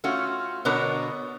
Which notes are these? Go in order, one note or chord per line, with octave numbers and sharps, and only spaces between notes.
A3 C#4 F4 F#4
B2 D3 B3 D4 A#4 C#5